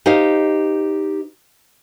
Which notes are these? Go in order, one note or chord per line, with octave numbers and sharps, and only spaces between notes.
D#4 G4 C5 D#5 F5